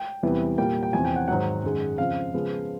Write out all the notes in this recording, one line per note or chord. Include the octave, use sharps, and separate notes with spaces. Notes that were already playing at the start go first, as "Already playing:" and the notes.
Already playing: G5
E2 C3 E3 G3 B3
A#2 G3 A#3 G5
G5
E2 C3 F3 G#5
G5
F#5
G#2 D#3 F#3 F#5
F#2 D#3 G#3
F2 C#3 F3 F5
C#3 F3 G#3 B3